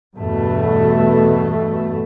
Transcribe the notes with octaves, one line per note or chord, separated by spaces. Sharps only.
E2 G2 B2 A3